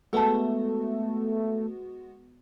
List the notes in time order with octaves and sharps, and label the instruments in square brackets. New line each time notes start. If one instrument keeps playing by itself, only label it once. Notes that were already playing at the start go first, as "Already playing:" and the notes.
[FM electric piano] G#3 B3 F#4 [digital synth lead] A3 [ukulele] A4 A5